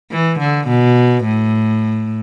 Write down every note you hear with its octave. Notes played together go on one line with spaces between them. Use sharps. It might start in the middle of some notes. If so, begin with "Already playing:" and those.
E3
D3
B2
A2